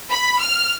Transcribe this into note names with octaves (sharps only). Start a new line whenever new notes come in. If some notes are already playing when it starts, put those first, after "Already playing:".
B5
F6